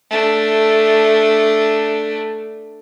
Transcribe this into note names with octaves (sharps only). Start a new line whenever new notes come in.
A3 D4